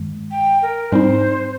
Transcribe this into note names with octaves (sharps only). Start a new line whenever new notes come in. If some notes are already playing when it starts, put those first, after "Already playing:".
Already playing: G2 D#3 G#3
G5
A#4
G#2 G3 C4 D#4 C5